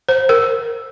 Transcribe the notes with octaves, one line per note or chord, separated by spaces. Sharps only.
C5
A#4